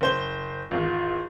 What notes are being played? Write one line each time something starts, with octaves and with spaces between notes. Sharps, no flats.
F#1 C5 G7
G#1 E2 F4